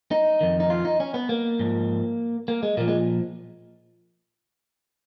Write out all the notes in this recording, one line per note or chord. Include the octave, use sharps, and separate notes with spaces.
D#4
F2 D#3
D#4
F4
D#4
C#4
B3
A#3
G#2 F3
A#3
G#3
A#2 F3 A#3
G#3